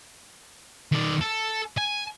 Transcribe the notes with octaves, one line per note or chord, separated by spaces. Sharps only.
D#3 D5
A4
G#5